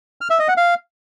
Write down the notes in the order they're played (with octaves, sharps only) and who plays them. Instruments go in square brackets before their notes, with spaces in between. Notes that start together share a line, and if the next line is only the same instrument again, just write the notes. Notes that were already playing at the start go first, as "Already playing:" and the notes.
[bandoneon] F6
E5
D#5
F#5
F5